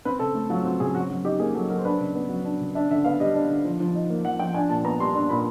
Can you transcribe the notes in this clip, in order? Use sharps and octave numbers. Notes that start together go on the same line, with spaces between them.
C4 B4
C#3 A4
A3
F#3 F4
C4 F#4
C#3 G#4
F#3 F#4
F#3 F#4
D#4 G4
A#3 G#4
F#3 A4
F#3 A#4
C5
D4 B4
C#3
B3
F#3
D4
C#3
D4 E5
D3 E5
B3 F5
G3 D#5
D4
D3
F3
F3
D#4
A#3
F3 F#5
F3 G5
D4 G#5
A#2 A5
B3 A#5
G3 C6
D4 C6
A#2 B5